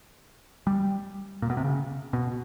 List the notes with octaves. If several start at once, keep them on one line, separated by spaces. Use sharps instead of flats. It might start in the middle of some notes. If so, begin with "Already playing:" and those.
G3
A#2
B2
C3
C#3
B2